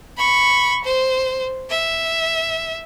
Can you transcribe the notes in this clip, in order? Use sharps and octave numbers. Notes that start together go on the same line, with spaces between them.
B5 C#6
C5
E5